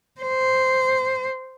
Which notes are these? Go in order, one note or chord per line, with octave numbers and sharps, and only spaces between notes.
C5